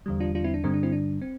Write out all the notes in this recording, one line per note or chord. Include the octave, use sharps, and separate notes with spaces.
E2 D3 G3
D4 F4
D4 F4
C4 E4
D4
G2 D3 G3 C4
D4
C4 E4
D4
C4